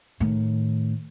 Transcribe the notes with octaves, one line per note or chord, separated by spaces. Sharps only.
A2 D#3